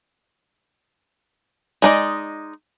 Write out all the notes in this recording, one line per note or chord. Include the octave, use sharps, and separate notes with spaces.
G#3 D#4 D5